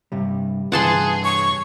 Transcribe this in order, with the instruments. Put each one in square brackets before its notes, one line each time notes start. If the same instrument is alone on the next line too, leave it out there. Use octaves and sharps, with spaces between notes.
[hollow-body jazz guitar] G2 C3 G3
[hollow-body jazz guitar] G2 C3 E3 [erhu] G#4 [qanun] F#5 A5 C6
[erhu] C#5 [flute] C#6